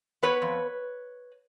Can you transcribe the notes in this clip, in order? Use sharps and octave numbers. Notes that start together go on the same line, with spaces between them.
B3 B4 C#5
F2